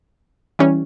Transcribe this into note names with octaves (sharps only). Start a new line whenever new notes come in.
E3 G3 C#4